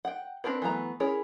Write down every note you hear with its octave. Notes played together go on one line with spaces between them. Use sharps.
F#5 G5
C4 D4 F#4 A#4 B4
E3 F#3 A3 B3 A#5
C#4 E4 G#4 A#4 C#5